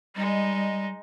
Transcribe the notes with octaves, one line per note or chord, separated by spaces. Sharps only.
G3 G#3 D#4